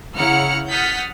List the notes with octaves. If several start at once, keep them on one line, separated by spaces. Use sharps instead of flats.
C#3 E4 F#5 A#5 F6 C#7
F#5 D#6 F6 G6 A6 B6